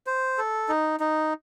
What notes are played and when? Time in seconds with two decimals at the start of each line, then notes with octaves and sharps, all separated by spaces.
0.07 C5
0.38 A4
0.69 D#4
1.00 D#4